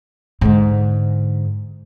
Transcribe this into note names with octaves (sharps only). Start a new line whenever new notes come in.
G#2 D3